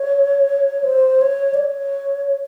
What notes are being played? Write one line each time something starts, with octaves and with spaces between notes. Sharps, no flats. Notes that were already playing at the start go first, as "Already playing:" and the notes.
Already playing: C#5
C5
C#5
D5
C#5